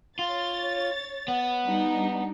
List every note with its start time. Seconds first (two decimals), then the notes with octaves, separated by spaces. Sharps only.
0.19 F4 C#5 A6
1.28 B3
1.65 G3 D4 D#4